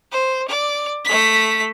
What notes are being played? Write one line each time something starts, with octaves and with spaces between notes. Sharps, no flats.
C5
D5
A3 B6